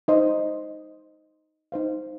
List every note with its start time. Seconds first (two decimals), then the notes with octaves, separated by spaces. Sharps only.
0.08 D#4 C5 D#5
1.72 D#4 C5 F5